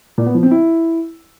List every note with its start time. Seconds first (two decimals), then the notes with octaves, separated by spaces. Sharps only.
0.18 A#2
0.26 B3
0.35 F3
0.43 C4
0.51 E4